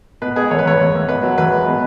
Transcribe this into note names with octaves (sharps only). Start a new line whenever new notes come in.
B2 B4
G#3 G#4
E2 C#5
B4
E2 C#5
E2
E2
B2 B4
F#3
E2 B4
G#3
B2